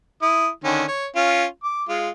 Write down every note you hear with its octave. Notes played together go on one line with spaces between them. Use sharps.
E4 D#6
D3 D#3 C#4
C#5
C#4 F4
D6
G#3 F4